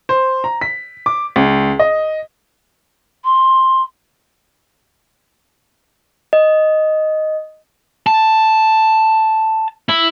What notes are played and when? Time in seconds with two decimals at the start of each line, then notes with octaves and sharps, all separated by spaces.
0.09 C5
0.44 A#5
0.61 B6
1.06 D6
1.36 C#2
1.79 D#5
3.24 C6
6.33 D#5
8.07 A5
9.89 E4